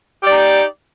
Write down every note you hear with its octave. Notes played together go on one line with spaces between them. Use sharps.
D#4 G4 D5